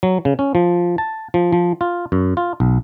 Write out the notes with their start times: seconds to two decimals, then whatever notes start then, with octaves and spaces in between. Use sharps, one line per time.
0.03 F#3
0.25 C#3
0.39 C#4
0.55 F3
0.98 A5
1.34 F3
1.53 F3
1.81 F4
2.12 F#2
2.37 F4
2.60 B1